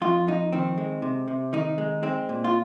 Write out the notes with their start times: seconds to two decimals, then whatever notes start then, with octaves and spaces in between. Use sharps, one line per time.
0.01 F2 F4
0.27 F2 D#4
0.52 D#3 C4
0.78 G#3
1.02 C3
1.28 C3
1.53 D#3 D#4
1.78 G#3
2.03 G#3 C4
2.29 A#2
2.44 F4